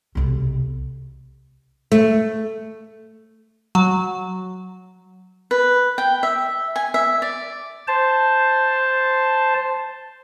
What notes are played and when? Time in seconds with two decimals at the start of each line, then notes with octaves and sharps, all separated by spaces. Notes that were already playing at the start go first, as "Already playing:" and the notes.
0.15 B1 C3
1.92 A3
3.75 F#3
5.51 B4
5.98 G5
6.23 E5
6.76 G#5
6.94 E5
7.22 D5
7.88 C5 A5